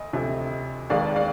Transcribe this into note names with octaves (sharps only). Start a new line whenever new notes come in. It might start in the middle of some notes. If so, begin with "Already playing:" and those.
Already playing: D2 D#5
D2 C3 F3
F1 D#2 D#3 G#3 D5 F5
D5 F5